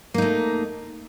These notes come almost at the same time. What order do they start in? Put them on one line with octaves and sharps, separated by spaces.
A#3 D#4 A3